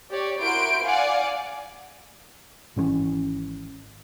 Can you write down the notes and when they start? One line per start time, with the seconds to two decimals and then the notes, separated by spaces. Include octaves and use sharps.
0.11 G4 C#5 D5
0.41 E4 F#4 A#4 C6 G6 D7
0.84 D5 F5 F#5 G#5
2.76 G#1 E3 C4 C#4